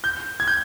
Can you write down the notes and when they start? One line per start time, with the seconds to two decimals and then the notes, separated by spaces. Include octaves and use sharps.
0.04 G6
0.40 G#6
0.47 G6